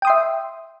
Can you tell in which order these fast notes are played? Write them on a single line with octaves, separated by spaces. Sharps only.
G5 D#6 C6 E5